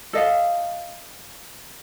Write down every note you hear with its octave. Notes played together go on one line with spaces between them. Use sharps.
A4 D#5 F5